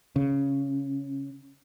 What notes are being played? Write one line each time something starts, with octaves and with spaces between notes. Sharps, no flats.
C#3